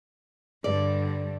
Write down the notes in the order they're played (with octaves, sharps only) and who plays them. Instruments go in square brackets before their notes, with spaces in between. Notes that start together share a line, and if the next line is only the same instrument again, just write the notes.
[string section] G2 D3 [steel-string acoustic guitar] D5